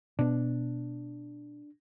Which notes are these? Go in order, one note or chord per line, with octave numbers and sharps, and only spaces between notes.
B2 B3 D4